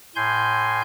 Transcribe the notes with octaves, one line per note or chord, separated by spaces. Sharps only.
A2 G#5 C6 G6